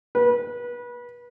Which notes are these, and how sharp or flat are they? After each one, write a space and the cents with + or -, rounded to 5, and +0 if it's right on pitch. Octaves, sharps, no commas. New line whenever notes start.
B4 -30